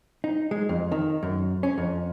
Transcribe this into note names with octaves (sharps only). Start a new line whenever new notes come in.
D#4
G#3
F2
D#3
F#2
C#4
F2